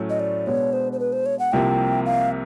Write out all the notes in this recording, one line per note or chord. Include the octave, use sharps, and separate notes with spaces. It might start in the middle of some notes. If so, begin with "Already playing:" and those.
Already playing: A2 F#3 A3 C#4
D#5
D5
B2 G#3 B3 D4 C#5
C5
C5
B4
C5
C#5
F#5
C2 C3 F3 A#3 G5
F5